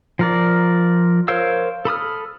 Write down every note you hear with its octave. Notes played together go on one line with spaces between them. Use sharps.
F3 A#4 D5
A#4 C5 C#5 F5 E6
A4 B5 D#6 F6